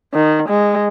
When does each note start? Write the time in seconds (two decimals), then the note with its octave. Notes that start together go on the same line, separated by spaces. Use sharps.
0.13 D#3
0.49 G#3